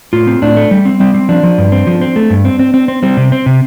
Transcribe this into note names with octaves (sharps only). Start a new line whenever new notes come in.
A2 F4
C4
A2 D4
A3
G3
C4
G3 C4
C4
F3 D4
F3
G2
C4
F3
C4
A3
G2
C4
C4
C4
C4
G3 C4
C3
C4
C3